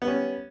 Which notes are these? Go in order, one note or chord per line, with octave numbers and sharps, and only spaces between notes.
G3 B3 C#4